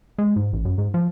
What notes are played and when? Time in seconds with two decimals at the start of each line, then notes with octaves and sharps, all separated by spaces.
0.18 G#3
0.36 G#2
0.53 A1
0.65 F#2
0.78 G#2
0.94 F3